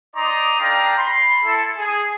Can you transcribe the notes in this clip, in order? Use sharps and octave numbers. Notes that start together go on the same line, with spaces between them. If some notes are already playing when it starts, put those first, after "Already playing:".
D#4 D5 A#5 C6 D6 D#6
D4 A4 D5 F5 G5 A#5
B5 C6
E4 A4
G#4